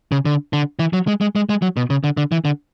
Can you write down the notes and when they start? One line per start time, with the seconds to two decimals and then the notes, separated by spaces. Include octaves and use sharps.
0.12 C#3
0.25 D3
0.53 D3
0.79 E3
0.93 F#3
1.07 G#3
1.21 G#3
1.36 G#3
1.49 G#3
1.62 F#3
1.77 B2
1.90 C#3
2.04 D3
2.17 D3
2.32 E3
2.45 D3